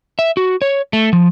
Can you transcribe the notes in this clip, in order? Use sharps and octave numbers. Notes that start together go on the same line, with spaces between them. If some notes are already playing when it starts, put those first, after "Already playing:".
E5
F#4
C#5
A3
F3